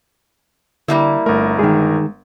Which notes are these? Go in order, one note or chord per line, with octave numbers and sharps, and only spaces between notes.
D3 G3 A#3 E4
G1 A3 A#4
D#3 G#3 G#4